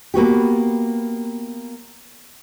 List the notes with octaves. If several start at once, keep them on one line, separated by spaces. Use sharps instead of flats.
A#3 B3 F#4 G4